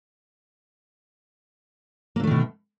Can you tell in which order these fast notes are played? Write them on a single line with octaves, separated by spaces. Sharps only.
A#3 D3 A3 D#3 B2